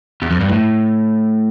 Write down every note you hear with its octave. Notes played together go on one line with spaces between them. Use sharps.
E2
F2
G2
A2